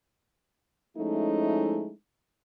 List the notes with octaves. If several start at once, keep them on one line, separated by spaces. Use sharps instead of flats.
F3 G#3 A3 C#4 D#4 E4